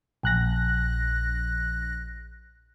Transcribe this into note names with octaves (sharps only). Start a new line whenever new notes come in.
A#1 F#6 A#6